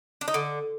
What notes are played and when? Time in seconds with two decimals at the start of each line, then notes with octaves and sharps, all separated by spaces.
0.21 D4
0.28 D#4
0.34 D3